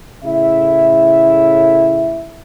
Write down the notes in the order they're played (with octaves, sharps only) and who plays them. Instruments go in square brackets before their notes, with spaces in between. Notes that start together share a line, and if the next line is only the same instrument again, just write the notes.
[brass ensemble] A2 C#3 A3 E4 E5